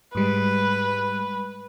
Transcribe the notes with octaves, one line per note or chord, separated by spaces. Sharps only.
G#2 G3 G#3 B4